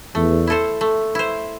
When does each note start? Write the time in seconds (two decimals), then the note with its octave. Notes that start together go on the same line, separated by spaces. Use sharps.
0.15 E2 A3
0.47 E4 A4 C5
0.81 A3
1.15 E4 C5